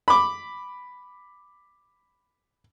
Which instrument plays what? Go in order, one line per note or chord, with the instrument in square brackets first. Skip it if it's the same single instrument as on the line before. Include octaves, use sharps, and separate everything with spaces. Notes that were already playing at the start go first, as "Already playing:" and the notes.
[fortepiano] B5 D6